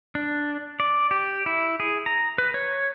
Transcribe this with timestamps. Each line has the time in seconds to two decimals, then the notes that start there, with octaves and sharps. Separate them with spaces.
0.15 D4
0.80 D5
1.11 G4
1.46 E4
1.80 G#4
2.06 A#5
2.38 B4
2.54 C#5